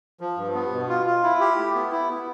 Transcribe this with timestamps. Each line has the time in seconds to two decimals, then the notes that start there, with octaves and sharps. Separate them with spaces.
0.21 F3
0.37 G2
0.54 B3
0.72 B2
0.89 F4
1.06 F4
1.23 E4
1.40 G4
1.58 A3
1.74 B3
1.92 E4
2.09 B3